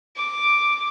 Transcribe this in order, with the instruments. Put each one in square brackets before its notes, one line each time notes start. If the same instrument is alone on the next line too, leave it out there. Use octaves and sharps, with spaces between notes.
[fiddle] D6